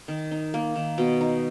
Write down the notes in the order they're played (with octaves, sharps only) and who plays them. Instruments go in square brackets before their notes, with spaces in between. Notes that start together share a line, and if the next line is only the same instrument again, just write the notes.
[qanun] D#3
D#4
A#3
D#3
B2
D#4